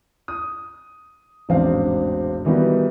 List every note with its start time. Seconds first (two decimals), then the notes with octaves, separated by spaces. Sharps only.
0.28 D#6
1.49 E1 A1 G#2 C4 D4 F5
2.45 D#3 E3 G3 B3 D#4 F#4